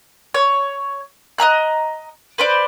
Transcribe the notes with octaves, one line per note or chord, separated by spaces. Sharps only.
C#5
D#5 E5 A#5 F#6
B4 C5 D5